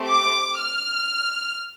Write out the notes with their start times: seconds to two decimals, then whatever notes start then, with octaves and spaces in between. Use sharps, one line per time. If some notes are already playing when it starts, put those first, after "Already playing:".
Already playing: A3 C4 G4
0.08 D6
0.61 F6